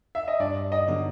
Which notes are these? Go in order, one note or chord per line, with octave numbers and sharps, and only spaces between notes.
E5
D#5
G2 D5
D#5
D3 F#3 B3 D#4